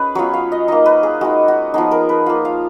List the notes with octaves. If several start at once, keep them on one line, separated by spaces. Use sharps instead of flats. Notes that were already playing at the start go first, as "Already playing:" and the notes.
Already playing: C#4 D#4 G#4 B4
F#3 B3 F4 C#5
F5
D#5
A#3 D#4 D#5
B4
G#4
G#3 D#4 F#4
F#4
F3 B3 D#4 G#4
A#4
B4
A#3 F4
F5